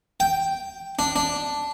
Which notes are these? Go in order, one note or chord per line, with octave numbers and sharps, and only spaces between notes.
G5
D4
D4